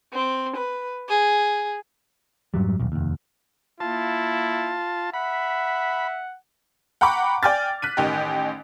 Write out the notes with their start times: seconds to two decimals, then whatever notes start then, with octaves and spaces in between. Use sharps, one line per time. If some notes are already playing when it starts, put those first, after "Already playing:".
0.13 C4
0.56 B4
1.09 G#4
2.54 F2 G#2 F#3 G3
2.79 D#1 B1
2.92 F1 D#2
3.80 A#3 E4 F4 A5
5.14 E5 F#5 B5
7.01 F#5 G5 A#5 B5 C#6 D6
7.43 D5 G5 G#5 F6 A6
7.82 F#6 B6 D#7
7.97 A1 D#3 D#4 G4